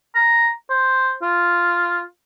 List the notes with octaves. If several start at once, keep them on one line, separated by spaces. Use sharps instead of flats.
A#5
C5
F4